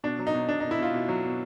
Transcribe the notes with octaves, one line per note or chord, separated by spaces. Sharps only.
B2 D4
F#3
D#4
B2
B2 D4
D#4
B2
E4
B2 F4
B2
F#3
B2